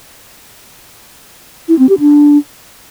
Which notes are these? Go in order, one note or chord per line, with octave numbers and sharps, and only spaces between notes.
E4
C4
G4
D4